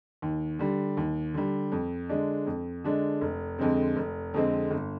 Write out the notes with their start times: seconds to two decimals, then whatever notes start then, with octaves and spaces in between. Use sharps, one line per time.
0.22 D#2
0.59 D3 G3
0.97 D#2
1.34 D3 G3
1.72 F2
2.09 D3 G#3 D4
2.47 F2
2.84 D3 G#3 D4
3.21 F1
3.59 F2 D3 G#3 C4
3.96 F1
4.34 F2 D3 G#3 C4
4.71 G1